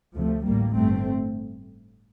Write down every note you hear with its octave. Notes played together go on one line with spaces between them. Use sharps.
D2 C3 F3 A3
A1 A2 G3 A#3
G1 G2 A3 C4